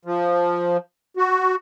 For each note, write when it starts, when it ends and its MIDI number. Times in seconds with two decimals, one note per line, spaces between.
0.05 0.77 53
1.17 1.55 66